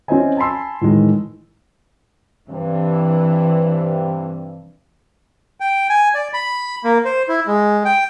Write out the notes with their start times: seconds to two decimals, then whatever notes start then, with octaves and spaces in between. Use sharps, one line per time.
0.08 C4 C#4 E4 C5 D#5 G#5
0.37 G#5 A5 B5 C6 E6
0.81 A2 D#3 E3 G#3
2.50 G2 C3 E3 C4
5.60 G5
5.90 G#5
6.14 D5
6.33 B5
6.84 A#3
7.05 C5
7.28 E4
7.47 G#3
7.85 G5